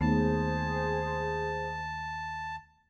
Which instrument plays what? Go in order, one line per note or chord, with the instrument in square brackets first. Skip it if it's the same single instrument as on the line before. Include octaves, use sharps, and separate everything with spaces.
[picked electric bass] D#2 [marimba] A3 B3 D#4 [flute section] G#4 C5 [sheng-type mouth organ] A5